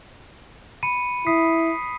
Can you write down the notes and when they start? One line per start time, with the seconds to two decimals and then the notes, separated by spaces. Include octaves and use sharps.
0.83 B5 C#7 D#7
1.27 E4 D#6 B6 C7